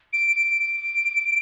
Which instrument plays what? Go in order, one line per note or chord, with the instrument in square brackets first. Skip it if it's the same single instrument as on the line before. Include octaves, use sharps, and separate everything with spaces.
[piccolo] D7
D7
D7